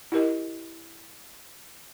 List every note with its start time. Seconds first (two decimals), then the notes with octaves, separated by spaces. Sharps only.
0.12 E4 G4 A#4 D#5